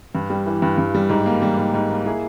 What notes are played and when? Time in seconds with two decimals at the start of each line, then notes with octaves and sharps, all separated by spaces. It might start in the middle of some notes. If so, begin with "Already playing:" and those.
0.15 G2
0.30 G3
0.46 E3
0.62 G2
0.78 G2
0.94 G3
1.09 G#2
1.26 A#3
1.42 G3
1.58 G#2
1.74 G#2
1.90 A#3
2.06 E4 G#4